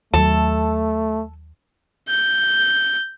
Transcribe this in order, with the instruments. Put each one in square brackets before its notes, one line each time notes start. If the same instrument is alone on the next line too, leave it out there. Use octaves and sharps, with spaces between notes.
[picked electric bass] D#2 F#3 [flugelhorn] A3 [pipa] A4
[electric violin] G6